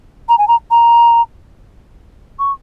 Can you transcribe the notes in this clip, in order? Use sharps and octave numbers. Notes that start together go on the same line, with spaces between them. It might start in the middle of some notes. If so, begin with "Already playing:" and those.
A#5
G#5
A#5
A#5
C#6